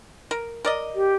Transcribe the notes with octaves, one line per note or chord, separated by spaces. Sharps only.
A#4
A#4 D5 D#5
G4